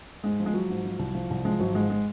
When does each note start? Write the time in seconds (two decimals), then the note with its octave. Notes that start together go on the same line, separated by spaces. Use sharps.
0.24 G#2 G#3
0.40 F3
0.46 G#3
0.54 F3 F#3
0.70 G#2
0.85 F3
0.99 C2
1.15 F3
1.30 C2
1.45 F3 G#3
1.60 G#1 F#3
1.75 G#2 G#3
1.90 G#3